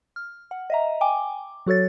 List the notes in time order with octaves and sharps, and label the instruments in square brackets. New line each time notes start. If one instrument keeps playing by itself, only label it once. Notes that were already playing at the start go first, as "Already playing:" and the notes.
[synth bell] F6
F#5
D#5 E5 A#5
G5 G#5 D6
F#3 F#4 A4 C#5 A6